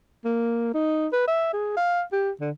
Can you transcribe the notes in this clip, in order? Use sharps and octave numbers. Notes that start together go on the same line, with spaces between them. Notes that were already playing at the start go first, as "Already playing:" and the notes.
A#3
D#4
B4
E5
G#4
F5
G4
D3